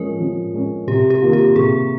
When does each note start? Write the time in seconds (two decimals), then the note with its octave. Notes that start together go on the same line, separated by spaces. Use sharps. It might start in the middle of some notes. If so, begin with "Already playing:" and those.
Already playing: F3 G#3 C#4 A#4
0.21 F3
0.54 G#3 C#4
0.87 C3 G4
1.10 G4
1.22 D#3 A#3 F4
1.33 G4
1.55 C3 G#4